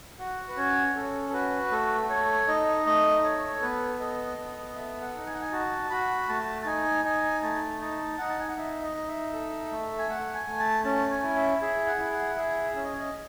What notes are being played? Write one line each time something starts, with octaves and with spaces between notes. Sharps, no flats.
F#4 F#5
B4
C#4 C#5
C#4 A4
A4
F#4 B4
A3 A4
A4 C#5
D#4 D#5
A3 D#5
A4 C#5
B3 B4
A4 D#5
B3
A4 E5
F#5
D#4
G#5
F#5
G#5
F#4 A5
F#4 B5
A3 A5
A5
D#4 G#5
D#4 G#5
A3 A5
D#4 A5
D#4 F#5
A5
G#5
F#5
D#4 E5
D#5
D#4
E5
A4
A3
G#5
A3 F#5
G#5
A3
A5
C#4 A5
G#5
E4
E5
G#4 E5
F#5
E4
F#5
G#4 E5
C#4 E5
D#5
C#5
D#5